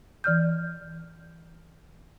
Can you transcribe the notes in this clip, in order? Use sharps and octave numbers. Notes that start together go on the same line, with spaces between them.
E3 D5 F6 G6